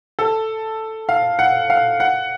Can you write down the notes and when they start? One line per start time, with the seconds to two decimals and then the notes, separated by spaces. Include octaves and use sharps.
0.19 A4
1.09 F5
1.39 F#5
1.70 F5
2.00 F#5